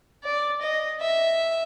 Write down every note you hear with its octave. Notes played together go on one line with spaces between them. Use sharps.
D5
D#5
E5